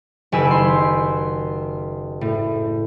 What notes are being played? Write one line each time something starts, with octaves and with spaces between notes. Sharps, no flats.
F#1 D#3 G4 G#5 B5 E6
C6
A2